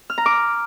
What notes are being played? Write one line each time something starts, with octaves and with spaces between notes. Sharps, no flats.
F6
A#5
D6